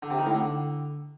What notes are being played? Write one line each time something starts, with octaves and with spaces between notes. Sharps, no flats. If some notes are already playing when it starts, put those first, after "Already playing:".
D3
C3
D#3
A2
D3